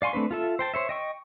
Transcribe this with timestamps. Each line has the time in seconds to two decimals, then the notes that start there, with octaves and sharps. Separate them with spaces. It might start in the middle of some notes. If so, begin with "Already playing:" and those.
0.02 D5 F5 G#5 C6 C#6
0.13 A3 C4 D4 B4
0.31 F4 A4 E5
0.59 C5 G5 A5
0.74 C5 C#5 E5
0.89 D#5 G5 C#6